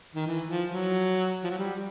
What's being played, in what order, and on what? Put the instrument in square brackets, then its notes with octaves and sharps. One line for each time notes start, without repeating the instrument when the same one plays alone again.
[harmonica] D#3
E3
F3
F#3
F3
F#3
G3